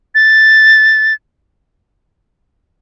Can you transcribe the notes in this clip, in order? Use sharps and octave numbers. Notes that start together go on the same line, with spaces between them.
A6